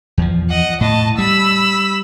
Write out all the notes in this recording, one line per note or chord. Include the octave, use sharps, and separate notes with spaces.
E2 F3
D#5 F#5
A2 D#5 A5
G3 B5 E6